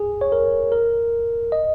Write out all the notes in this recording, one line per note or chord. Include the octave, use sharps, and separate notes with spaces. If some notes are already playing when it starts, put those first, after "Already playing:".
Already playing: G#4
C#5
A#4
A#4
D#5